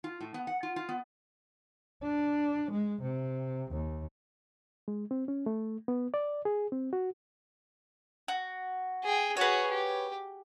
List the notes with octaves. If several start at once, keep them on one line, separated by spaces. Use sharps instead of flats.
F4
A2
B3
F#5
F4
F4
B3
D4
G#3
C3
D#2
G#3
C4
C#4
A3
B3
D5
G#4
C4
F#4
F#4
G#4 G5
F#4 G#4 B4 C#5
G4